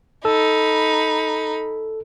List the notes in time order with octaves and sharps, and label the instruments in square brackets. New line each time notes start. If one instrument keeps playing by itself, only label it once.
[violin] D#4 B5 [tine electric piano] A4